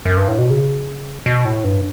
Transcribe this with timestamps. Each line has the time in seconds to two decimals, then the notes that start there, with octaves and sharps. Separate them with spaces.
0.05 F#2
0.17 G2
0.28 A2
0.38 B2
0.50 C#3
1.26 B2
1.45 A2
1.64 G2